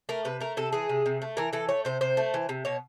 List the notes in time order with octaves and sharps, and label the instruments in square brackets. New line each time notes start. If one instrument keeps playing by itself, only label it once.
[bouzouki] A3 A#4
C3 B4
A3 A#4
C3 A4
E3 G#4
C3
C3
A3
E3 A#4
E3 A4
A3 C#5
C3 C5
C3 C5
A3
E3
C3
B2 C#5